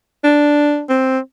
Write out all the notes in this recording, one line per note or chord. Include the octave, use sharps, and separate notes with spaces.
D4
C4